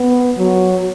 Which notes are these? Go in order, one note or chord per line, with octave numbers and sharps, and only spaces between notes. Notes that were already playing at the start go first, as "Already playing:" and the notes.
Already playing: B3
F#3